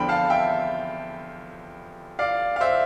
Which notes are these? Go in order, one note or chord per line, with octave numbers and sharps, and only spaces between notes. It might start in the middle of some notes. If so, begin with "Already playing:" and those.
Already playing: E2 D3 F3 G5 B5 C6
F5 A5
E5 G5
D5 F5
F5
C5 E5